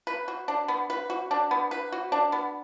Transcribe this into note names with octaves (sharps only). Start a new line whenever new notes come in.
B4
F#4
D4
B3
B4
F#4
D4
B3
B4
F#4
D4
B3